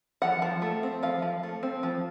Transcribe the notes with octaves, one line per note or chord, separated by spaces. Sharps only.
F3 F#5
F3
A3
C4
F3 F5
F3
A3
C4
F3